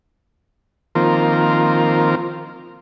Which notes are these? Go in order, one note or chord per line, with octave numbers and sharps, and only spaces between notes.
D#3 F3 A#3 C4 F4 A#4